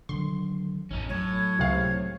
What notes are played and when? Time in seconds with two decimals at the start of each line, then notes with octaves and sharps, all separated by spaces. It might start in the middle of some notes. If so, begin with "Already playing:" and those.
0.09 D3 D#3 F#3 C6
0.91 A1 F#2 A2 C#4 D#4
1.09 A2 F#3 C#5
1.58 C#2 C3 F5